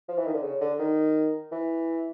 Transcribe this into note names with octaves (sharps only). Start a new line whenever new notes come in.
F3
E3
D#3
D3
C#3
D3
D#3
E3